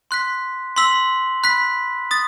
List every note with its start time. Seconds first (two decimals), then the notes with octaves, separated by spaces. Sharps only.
0.11 C6 F#6 B6
0.76 C6 E6 B6 F#7
1.44 B5 F#6 B6
2.11 D#6 A6